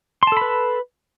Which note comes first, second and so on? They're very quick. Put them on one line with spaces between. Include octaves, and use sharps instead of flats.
C6 A5 A4 B5 B4